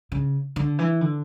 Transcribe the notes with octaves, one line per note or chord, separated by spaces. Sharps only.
C#3
D3
E3
D3